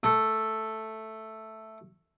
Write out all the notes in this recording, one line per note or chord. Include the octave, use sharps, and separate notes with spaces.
A3 A4